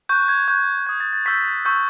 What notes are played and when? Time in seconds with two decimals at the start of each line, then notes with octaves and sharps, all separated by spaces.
0.09 C#6 F#6 G6
0.28 G#6
0.48 C#6 F#6 G6
0.86 D#6 G6 G#6
1.00 A6
1.13 A6
1.26 C#6 E6 G6 B6
1.65 C#6 E6 G6